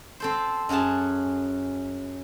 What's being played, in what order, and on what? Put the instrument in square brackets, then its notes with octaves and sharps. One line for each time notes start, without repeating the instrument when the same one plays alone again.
[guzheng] C4 A4 C5
F#2 C#4 F#4 G#4 A5